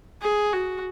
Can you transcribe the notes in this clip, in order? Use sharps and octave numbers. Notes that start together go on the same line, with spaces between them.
G#4
F#4